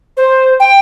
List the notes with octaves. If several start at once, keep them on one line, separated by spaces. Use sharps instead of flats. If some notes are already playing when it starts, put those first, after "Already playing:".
C5
G5